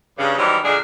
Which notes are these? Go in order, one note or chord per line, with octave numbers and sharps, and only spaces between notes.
G2 C#3
D#3 E3 F#3 G3 C4
A#2 D3 G#3 D4 G#4